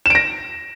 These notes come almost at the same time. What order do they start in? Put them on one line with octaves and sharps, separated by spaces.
E7 D7 A#6